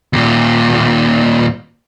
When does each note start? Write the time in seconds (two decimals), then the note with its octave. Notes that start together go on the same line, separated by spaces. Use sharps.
0.13 D#2 A#2